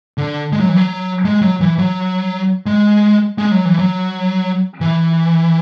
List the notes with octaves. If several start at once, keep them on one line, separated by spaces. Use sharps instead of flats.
D3
G#3
F#3
E3
F#3
G#3
F#3
E3
F#3
G#3
G#3
F#3
E3
F#3
E3